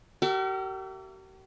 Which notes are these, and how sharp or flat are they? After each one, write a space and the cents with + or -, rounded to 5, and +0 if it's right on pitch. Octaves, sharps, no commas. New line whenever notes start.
G4 -45 A#4 -40 E5 +30